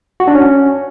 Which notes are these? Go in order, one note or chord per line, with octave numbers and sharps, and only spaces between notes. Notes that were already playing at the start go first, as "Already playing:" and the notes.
F#4
D4
C#4